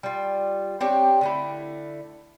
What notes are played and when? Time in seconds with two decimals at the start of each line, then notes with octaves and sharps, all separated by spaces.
0.03 G3 F4
0.81 C4 D4 G4 C#5
1.21 D3 A3 E4